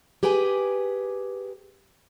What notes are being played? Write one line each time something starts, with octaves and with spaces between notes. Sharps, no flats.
G4 G#4 B4 G5 G#5